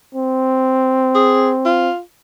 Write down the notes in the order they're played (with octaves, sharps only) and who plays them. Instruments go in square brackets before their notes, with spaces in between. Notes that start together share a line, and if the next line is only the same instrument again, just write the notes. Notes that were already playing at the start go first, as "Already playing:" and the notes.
[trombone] C4
[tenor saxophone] G#4
F4